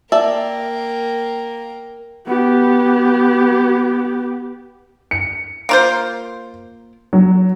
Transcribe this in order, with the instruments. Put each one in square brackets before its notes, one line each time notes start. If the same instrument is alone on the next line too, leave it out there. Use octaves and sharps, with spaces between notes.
[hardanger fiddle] A#3 G5 [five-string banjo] D5 E5 A5
[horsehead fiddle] B3 G4
[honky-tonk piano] C#7
[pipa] A#3 F4 C5
[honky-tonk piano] F#3